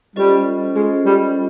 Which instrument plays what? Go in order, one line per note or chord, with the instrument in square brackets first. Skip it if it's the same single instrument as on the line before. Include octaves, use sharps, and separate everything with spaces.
[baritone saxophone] G3 [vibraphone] C#4 F4 A4 C5 D#5
[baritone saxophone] G#3 [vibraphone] C#4 F4 A4 C5 D#5
[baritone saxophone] G3